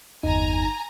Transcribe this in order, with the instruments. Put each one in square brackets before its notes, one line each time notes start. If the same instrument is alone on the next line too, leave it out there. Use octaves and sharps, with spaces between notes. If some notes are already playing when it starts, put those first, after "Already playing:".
[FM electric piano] G1 D#4 [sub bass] E2 [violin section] G#5 A#5